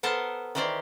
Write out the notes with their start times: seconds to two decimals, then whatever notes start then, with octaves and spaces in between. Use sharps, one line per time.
0.03 B3 A4 A#4 C5 A5
0.55 D#3 E3 G4 C5 D5